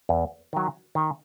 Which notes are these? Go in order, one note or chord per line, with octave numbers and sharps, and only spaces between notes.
E2
D#3 F#3
D#3